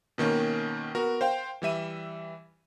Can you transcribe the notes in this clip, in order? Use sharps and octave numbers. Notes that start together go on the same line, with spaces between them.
B2 D#3 A#3 C#4
B3 F#4 A#4
C5 F5 G5
E3 G3 E5 D#7